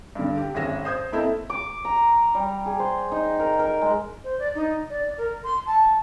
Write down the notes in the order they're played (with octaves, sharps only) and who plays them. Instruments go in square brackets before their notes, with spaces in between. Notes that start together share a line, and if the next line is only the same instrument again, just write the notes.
[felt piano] G2 D3
G4
G#1 C#4 G#4 E5 A#6 E7
C5 D#6 G6 G#6
A#3 C4 E4 A4 D#5 E5
[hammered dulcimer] D6
A#5
G3
G#4
C5
D#4
A#4
A#4
G#3
[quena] C5
D5
D#4
D5
A#4
C6
A5